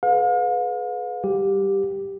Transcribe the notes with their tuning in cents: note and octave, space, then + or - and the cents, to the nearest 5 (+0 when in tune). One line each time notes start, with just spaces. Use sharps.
G#4 +40 B4 +10 F5 +40
G3 +0 G4 +0